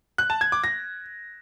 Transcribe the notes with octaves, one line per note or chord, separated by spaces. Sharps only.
F#6
A5
G#6
D6
A#6